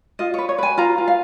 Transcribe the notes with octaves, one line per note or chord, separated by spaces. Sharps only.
F4 D#5
B4 C#5
C#5
B4 G#5
F4 A#5
F4
F5